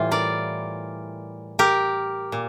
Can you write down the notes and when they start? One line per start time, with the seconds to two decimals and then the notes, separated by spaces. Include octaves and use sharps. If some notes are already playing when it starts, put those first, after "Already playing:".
Already playing: A2 E3 G3 F4
0.11 A#4 D5
1.59 G4 A#4
2.32 A#2